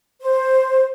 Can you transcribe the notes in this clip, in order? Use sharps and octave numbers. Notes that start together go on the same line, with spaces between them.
C5